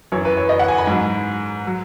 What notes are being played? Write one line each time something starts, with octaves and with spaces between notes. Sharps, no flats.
F#2 E3 C#5
B4
C#5
D#5
F#5
G#5
B5
G#2 F#3
F#3